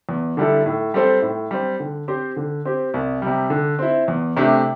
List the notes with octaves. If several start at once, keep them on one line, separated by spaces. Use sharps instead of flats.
E2
D3 G3 E4 A4
A2
G3 C4 A4 C5
A2
G3 C4
D3
C4 G4 C5
D3
C4 G4
C2
C3 G3
D3
C4 E4
E2
C3 A3 D4 G4